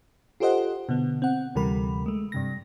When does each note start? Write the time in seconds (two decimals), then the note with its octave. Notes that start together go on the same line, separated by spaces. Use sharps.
0.40 F4 G4 A4 C5 D#5 F#5
0.89 B2 D3 B3
1.22 C4 F#5
1.55 D2 C3 E3 G3 A#4 B5
2.06 G#3 A3
2.32 G2 C3 A#6